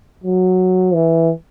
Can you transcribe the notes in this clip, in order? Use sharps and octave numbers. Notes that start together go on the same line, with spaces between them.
F#3
E3